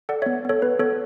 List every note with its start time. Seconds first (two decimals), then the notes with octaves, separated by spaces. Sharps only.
0.09 A4 D5 F#5
0.22 C#5 E5
0.26 B3
0.45 B3 A4 C#5
0.62 B3 B4
0.79 B3 A4 C#5